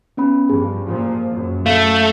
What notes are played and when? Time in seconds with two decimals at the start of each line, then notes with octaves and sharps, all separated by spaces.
0.17 B3 C#4 B5
0.49 G2 F3 G#4
0.87 A#2 F3
1.30 F#2
1.66 A3 F5